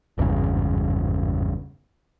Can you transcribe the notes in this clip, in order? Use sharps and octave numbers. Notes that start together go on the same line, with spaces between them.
G#1 E2 G2 C#3